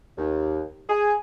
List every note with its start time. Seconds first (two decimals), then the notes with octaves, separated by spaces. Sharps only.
0.18 D#2
0.90 G#4